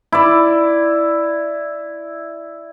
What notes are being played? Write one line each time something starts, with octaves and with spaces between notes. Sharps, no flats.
E4 D5